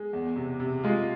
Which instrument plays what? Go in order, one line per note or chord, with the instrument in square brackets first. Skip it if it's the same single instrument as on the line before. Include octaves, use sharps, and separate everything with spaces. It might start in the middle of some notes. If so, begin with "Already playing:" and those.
Already playing: [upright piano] G#3
E2
C3
C3
[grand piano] G#3 [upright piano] F4